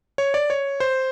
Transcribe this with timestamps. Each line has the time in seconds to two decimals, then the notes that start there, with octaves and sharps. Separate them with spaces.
0.18 C#5
0.34 D5
0.50 C#5
0.80 C5